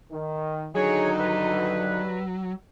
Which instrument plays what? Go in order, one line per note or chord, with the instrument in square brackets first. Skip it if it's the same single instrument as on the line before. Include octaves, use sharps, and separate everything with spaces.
[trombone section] D#3
[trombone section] D3 D#3 D#4 [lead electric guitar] F#3 [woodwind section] G#4 C#5
[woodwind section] G2 B4